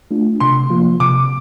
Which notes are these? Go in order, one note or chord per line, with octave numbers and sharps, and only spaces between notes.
A3 D4 F4
C3 C6
F3 A#3 F4
C3 D6